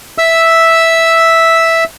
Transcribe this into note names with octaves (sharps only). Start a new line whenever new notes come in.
E5 E6